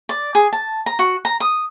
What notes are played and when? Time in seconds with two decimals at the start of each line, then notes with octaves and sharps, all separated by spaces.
0.09 D5
0.35 G#4
0.53 A5
0.86 A#5
0.99 F#4
1.25 A#5
1.40 D#6